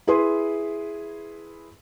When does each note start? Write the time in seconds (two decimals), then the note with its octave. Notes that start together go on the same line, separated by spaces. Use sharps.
0.07 E4 G#4 B4 C6